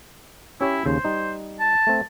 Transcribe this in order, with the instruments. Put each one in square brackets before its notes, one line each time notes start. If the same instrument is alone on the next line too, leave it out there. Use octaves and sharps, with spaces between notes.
[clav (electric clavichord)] C#4 G4 C#5 [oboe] E4
[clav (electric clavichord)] D#2 C#3 [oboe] C5
[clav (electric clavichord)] G3 D#4
[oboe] A5
[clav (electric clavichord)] A3 C4